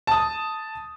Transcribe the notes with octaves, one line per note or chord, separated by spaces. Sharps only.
A5 D#6